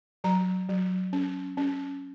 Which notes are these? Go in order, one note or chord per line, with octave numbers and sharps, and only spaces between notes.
F#3 A#5
F#3
C#4
C#4